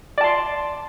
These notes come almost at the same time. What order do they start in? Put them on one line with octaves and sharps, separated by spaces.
D5 A5 C6